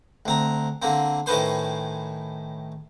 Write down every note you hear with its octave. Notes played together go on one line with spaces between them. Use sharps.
D2 C4 A#5
D3 A#3 C4
A2 D#3 C#4 B4 C5 C6